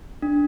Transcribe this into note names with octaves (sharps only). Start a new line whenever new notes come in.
D4